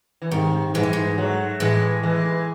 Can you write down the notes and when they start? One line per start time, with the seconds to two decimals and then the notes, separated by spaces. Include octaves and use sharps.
0.22 E3
0.31 G#2 C3 D#3
0.74 G#2 E3 G#3
0.83 F#2
0.93 G#2
1.17 F#3 A3
1.60 A2 E3 G#3
2.03 E3 G#3